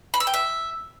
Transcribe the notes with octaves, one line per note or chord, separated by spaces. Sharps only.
B5
E6
G5
E5